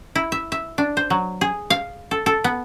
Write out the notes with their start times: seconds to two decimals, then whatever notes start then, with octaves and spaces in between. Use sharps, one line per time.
0.15 E4
0.32 E5
0.52 E5
0.78 D4
0.97 C5
1.10 F#3
1.41 G#4
1.70 F5
2.11 A4
2.26 A4
2.44 B3